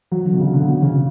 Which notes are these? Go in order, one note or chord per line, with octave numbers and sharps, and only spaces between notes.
F#3
D3
B2
C#3
D3
B2
C#3